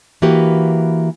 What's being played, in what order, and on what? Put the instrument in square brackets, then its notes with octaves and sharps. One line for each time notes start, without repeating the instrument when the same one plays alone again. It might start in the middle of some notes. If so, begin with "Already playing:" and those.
[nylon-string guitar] E3 A#3 F#4 G4 B4